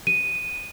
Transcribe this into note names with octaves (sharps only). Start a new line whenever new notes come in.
D#7